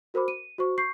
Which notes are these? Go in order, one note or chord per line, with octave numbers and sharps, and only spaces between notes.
F#4 A#4 C5 B5 D6
D#7
F#4 C5 C#6
C#6 G6 C7